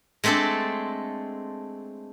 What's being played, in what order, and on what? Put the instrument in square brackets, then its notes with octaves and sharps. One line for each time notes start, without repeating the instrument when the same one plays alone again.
[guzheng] G#3 A3 C4 D4 A4